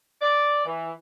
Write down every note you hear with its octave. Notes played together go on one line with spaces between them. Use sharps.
D5
E3